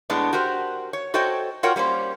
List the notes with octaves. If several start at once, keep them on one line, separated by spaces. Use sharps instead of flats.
A2 G#3 B3 D4
F#4 G4 A#4 C5
C#5
F#4 A4 C5 C#5 D#5 G5
F4 F#4 A#4 C#5 F#5 G5
G3 A#3 C#4 C5